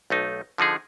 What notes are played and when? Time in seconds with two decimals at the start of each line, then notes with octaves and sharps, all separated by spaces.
0.10 B1 A3 D#4
0.58 D3 F3 D#4 G#4